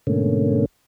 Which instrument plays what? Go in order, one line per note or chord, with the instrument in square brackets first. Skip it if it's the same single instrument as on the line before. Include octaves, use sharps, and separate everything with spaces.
[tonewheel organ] G#2 B2 D3 A3 A#3 C#4